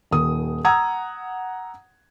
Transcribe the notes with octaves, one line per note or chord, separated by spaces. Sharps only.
D#1 D#2 D#6
F#5 A#5 D#6 E6 G#6